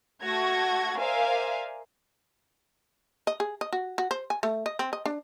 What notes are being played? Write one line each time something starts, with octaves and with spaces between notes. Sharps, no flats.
A3 F#4 G#6 A#6
A#4 C5 D5 E5 F5 G#5
D#5
G#4
D#5
F#4
F#4
C5
G#5
A3
D#5
C4
D#5
D4